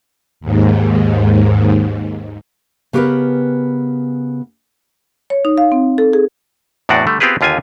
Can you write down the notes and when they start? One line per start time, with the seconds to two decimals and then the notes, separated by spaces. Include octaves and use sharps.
0.40 D#2 G#2
2.93 C#3 B3 G4 G#4 A#4 B4
5.30 C#5
5.45 D#4
5.58 F5
5.72 C4
5.98 A4
6.13 G#4
6.89 E2 A2 C4 D4 F#4 D5
7.07 D3 G3 A3
7.20 B3 C4 F4 G4 G#4 B4
7.41 D#2 D3 F4 G4 G#5